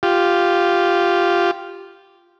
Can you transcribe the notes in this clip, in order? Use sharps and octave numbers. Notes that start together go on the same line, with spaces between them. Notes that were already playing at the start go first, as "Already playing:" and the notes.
F4 G4